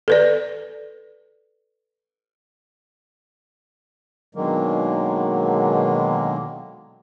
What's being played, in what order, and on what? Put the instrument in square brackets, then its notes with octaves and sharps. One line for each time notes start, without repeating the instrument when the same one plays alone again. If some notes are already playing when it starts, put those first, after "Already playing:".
[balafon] A4 B4 D5
[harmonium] B2 D3 D#3 F#3 G#3 A#3